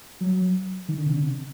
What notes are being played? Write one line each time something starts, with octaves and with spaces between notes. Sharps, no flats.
F#3
D#3
D3
C3
D3
C3